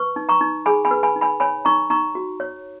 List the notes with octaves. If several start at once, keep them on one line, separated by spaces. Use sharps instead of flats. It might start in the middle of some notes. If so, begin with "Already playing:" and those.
Already playing: B4 C#6
D#4
A#5 C#6
D#4
G#4 G#5 B5
G#5 B5
B4
G#5 B5
D#4
G#5 B5
C#5 G#5 B5
D#4 A#5 C#6
D#4 A#5 C#6
F#4
C#5